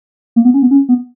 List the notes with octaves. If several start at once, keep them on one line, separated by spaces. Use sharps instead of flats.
A#3
B3
C#4
B3
C#4
B3